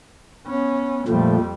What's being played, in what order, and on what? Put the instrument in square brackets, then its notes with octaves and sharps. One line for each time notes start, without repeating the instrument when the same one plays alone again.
[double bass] B3 C#4
[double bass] F2 G3 [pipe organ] A#2 F3 A3